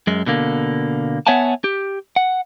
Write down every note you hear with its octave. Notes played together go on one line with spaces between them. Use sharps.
F#2 G#3
B2 D3 A#3
B3 C#5 E5 F#5 G#5 A5
G4
F#5